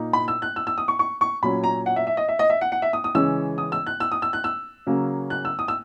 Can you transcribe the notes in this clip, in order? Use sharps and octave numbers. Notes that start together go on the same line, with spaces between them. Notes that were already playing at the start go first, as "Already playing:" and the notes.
Already playing: A#2 A#3 D#4
B5
E6
F#6
E6
E6
D#6
C#6
C#6
C#6
A#2 F#3 C#4 B5
A#5
F#5
E5
E5
D#5
E5
D#5
E5
F#5
F#5
E5
D#6
D#6
C#3 E3 G#3 C#4 E6
D#6
E6
F#6
E6
D#6
E6
F#6
E6
C#3 F#3 A#3 C#4
F#6
E6
D#6
E6